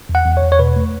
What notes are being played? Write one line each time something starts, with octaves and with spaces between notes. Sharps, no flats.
E2
F#5
E2
C#5
E2
C#5
B2 B4
A3